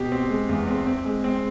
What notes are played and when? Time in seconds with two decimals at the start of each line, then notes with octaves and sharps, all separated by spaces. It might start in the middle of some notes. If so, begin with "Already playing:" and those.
Already playing: B2 G4
0.12 C4
0.29 G#3
0.49 E2
0.68 C4
0.87 C4
1.05 G#3
1.24 C4